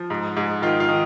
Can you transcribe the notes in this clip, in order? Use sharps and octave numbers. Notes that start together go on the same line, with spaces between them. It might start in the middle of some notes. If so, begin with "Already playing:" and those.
Already playing: F3
G#2
G#2
D#3 F4
F4
D#3